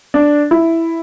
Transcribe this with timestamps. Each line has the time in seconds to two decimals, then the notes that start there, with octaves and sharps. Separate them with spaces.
0.14 D4
0.51 E4